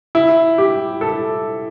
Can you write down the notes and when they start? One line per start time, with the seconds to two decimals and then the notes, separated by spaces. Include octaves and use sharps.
0.15 E4
0.58 G4
1.01 A4